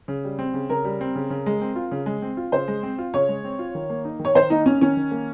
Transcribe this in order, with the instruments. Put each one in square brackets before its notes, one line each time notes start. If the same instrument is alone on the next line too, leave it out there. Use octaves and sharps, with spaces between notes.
[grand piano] C#3
G3
C4
C#3
[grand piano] C#3 [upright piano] A#4
[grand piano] G3
C4
C#3
C#3
G#3
C4
F4
C#3
G#3
C4
F4
[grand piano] C#3 [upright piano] C5
[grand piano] G#3
C4
F4
[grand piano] C#3 [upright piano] C#5
[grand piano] G#3
C4
F4
D#3
A#3
D#4
D#3
[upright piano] C#5
[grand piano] D#3 [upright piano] C5
[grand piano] A#3 [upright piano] D#4
[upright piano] C#4 [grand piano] D#4
[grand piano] D#3 [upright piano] C#4
[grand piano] D#3
A#3